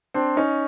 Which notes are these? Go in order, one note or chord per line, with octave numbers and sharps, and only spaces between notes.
C4 D4
C#4 D#4